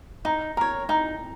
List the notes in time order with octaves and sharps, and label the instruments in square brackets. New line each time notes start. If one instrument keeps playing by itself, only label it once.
[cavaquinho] D#4 [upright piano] A#5
[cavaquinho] A#4 C#5 [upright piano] A#5
[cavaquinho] D#4 [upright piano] A#5